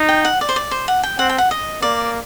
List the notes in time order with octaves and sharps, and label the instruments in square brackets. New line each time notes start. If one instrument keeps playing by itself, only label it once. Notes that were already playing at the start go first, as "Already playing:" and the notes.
Already playing: [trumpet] D#4
[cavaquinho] G5
F#5
D5
C5
D5
C5
F#5
G5
[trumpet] C4 [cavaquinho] F#5
[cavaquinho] G5
F#5
D#5
[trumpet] A#3 [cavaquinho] D5